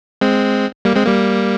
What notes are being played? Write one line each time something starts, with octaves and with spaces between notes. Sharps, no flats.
G#3 C4
G3 A#3
G#3 C4
G3 A#3